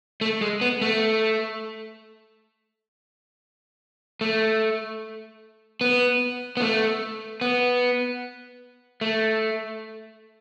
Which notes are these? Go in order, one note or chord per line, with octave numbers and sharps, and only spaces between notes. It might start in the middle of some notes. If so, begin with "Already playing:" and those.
A3
G#3
B3
A3
A3
B3
B3
A3
B3
A3